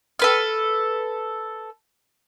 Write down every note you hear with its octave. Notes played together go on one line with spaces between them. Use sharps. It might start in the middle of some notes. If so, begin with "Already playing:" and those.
A4 B4 F6